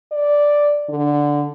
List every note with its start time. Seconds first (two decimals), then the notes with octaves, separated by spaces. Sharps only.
0.12 D5
0.89 D3